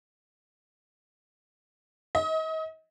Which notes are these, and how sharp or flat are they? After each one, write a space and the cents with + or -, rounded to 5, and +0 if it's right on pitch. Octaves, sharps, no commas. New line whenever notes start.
D#5 +40